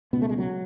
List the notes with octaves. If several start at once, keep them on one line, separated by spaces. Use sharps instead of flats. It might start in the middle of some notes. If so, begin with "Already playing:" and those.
C#2 B2 B3
A3
G#3
F#3